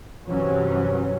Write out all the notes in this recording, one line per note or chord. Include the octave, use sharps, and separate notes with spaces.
G2 C3 E3 F#3 C#4